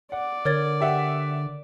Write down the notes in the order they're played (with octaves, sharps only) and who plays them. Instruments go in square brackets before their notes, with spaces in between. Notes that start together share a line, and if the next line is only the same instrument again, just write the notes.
[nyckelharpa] D5 [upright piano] F#5
[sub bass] D3 [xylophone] A#4 C#5 A6
[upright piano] G4 E5 F#5